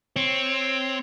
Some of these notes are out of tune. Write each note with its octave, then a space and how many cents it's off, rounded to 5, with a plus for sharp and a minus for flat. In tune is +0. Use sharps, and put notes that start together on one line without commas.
C4 +0 C#5 -5